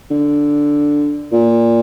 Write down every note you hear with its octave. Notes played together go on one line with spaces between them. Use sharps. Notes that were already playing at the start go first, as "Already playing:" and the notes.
D3
A#2